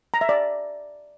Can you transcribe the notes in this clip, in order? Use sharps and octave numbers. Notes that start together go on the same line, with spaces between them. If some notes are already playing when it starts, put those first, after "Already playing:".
A#5
E5
D5